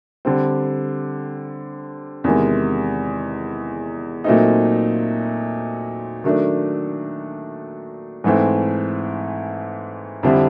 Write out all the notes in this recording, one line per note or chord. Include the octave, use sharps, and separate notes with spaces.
D3 G3 C4
E2 C3 D#3 G#3
A#2 F#3 A3 C4 D#4
D#3 F#3 A3 D4
G#2 E3 A3 C4
F2 D3 G3 C4 E4